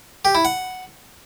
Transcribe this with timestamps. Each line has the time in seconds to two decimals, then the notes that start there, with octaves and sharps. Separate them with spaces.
0.25 G4
0.35 E4
0.45 F#5